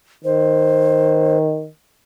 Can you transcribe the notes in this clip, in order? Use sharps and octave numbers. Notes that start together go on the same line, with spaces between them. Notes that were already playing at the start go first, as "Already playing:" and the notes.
D#3 C5